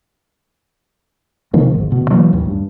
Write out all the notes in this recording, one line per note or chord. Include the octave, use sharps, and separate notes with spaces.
C3 D#3 F3 A#3
D#1 G#1 D2 G#2
D2 B2
E3 F#3 G#3 A#3
A1 D#2
G2